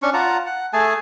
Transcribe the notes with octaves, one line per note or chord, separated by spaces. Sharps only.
C#4 D4 C#6
F4 F#5 A5 A#5
F#5
A3 G#4 G#5 A5